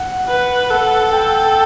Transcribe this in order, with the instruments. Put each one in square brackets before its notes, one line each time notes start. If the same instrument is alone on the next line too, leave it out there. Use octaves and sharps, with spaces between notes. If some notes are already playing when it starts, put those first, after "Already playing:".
Already playing: [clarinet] F#5
[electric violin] B4
[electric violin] A4 [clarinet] F#5
[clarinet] G5